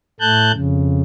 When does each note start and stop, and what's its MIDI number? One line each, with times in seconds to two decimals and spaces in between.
0.20 0.52 45
0.20 0.52 57
0.20 0.52 81
0.20 0.52 90
0.20 0.52 91
0.53 1.02 41
0.53 1.02 49